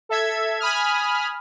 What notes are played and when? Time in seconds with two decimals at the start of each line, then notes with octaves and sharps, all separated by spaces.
0.09 A4 E5 G#6
0.60 G#5 B5 D#6 F6